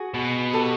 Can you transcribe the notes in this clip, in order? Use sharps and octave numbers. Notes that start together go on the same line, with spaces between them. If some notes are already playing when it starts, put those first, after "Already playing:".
Already playing: F#4 G#4
B2
G4 A4